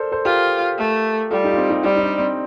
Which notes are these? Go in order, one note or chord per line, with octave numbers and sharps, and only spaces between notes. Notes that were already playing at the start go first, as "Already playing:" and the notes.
Already playing: A4 A#4 C5 D5
A4 C5
F4 G4 A#4
A3
G3 F4 A4
D#4 G4
F4
C4 D#4
D#4 G4
G3 C4 D#4
D#4
D4
C4